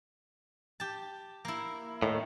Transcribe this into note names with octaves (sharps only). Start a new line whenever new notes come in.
G4 A5
A#3 E4
A2 D#3